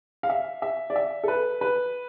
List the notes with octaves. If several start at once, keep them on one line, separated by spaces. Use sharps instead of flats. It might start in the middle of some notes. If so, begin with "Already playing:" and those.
F5
E5
E5
D5
E5
A4
B4
B4